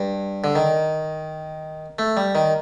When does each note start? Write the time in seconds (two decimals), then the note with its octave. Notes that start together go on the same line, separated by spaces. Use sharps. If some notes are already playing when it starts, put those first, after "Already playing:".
Already playing: G2
0.44 D3
0.56 D#3
1.99 A3
2.17 G3
2.35 D#3